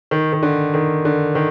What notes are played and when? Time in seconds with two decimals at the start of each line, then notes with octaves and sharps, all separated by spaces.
0.11 D#3
0.33 D#3
0.43 D3
0.74 D#3
1.05 D3
1.35 D#3